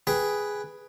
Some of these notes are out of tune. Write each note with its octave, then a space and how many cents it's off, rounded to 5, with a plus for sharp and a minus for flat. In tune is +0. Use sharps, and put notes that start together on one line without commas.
G#4 +0 B4 +0 G5 +5